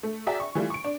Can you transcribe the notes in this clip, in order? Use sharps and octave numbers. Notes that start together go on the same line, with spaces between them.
A3
F#4 G#4 D5 E5 G5 A#5
C#6
E3 G3 A3 F4
C#6 D7
D4